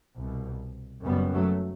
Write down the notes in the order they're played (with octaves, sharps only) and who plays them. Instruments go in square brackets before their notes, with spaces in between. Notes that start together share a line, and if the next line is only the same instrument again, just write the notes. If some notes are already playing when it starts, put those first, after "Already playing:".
[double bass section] C2 B2
F#1 F#2 G3 B3
F#3 A3